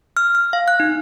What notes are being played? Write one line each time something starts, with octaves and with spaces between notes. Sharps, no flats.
F6
F6
F5
F#6
D#4